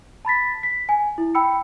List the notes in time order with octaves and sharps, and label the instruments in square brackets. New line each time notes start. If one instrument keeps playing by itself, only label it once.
[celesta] A5 B5 A6 B6
B6
G#5
E4
G5 B5 E6 C#7